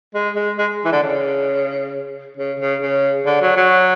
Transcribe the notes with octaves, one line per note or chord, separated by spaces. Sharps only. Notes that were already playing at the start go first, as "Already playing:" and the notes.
G#3
G#3
G#3
E3
D3
C#3
C#3
C#3
C#3
D3
F#3
F#3